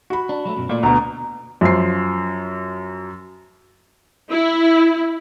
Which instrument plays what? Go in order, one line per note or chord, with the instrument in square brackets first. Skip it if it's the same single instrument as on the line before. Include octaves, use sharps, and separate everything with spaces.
[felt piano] F#4 B5
[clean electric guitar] D4
F#3 G3 A3
F#2 B2
[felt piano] A#2 [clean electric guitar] A3 D5
[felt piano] D2 B2 [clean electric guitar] A#5
[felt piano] F#2 F3 C7
[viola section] E4